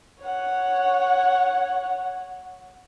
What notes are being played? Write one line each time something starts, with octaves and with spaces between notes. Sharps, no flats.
C#5 F#5